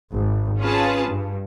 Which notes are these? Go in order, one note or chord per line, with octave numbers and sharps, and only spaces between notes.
G#1
C#4 F4 G#4 B4 A5
G2